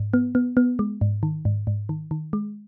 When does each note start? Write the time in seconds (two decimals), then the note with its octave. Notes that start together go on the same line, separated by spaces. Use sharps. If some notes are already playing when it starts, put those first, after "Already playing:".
Already playing: G#2
0.14 B3
0.35 B3
0.57 B3
0.79 G#3
1.01 G#2
1.23 D#3
1.45 G#2
1.67 G#2
1.89 D#3
2.11 D#3
2.33 G#3